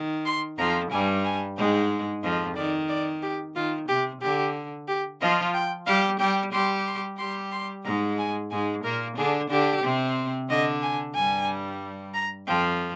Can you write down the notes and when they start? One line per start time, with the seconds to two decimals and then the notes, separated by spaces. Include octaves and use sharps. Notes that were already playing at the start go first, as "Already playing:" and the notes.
Already playing: D#3
0.25 C6
0.58 F2 F3 A#5
0.91 G2 G3 G#5
1.25 G#5
1.57 G#2 G#3 G5
2.23 F2 F3 D#5
2.56 D#3 D5
2.89 D5
3.23 G4
3.55 D#3 F4
3.88 C3 G4
4.22 D3 G4
4.88 G4
5.21 F3 F4 D#5
5.54 G5
5.86 G3 G4 F5
6.19 G3 G4 G5
6.52 G3 G4 C6
6.86 C6
7.18 G3 G4 C6
7.52 C6
7.85 G#2 G#3 A#5
8.19 G#5
8.51 G#2 G#3 G#5
8.84 A#2 A#3 A#4
9.17 D3 D4 G#4
9.50 D3 D4 G4
9.83 C3 C4
10.49 D3 D4 D#5
10.82 G#5
11.15 G2 G3 G#5
12.14 A#5
12.47 F2 F3 G5